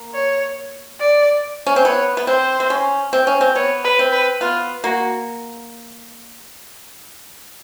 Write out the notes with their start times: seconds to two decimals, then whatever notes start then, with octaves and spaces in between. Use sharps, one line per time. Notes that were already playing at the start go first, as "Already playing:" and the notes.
Already playing: A#3
0.15 C#5
1.00 D5
1.66 C#4
1.76 C4
1.85 B3 C#5
2.17 B3
2.27 C4 C5
2.60 C4
2.70 C#4
3.13 C4
3.27 C#4
3.41 C4
3.55 B3 C#5
3.84 B4
3.99 C4
4.12 B4
4.41 B3 F4
4.84 A#3 F#4